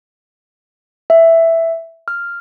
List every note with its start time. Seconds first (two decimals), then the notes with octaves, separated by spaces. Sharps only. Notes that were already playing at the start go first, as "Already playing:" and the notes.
1.10 E5
2.08 F6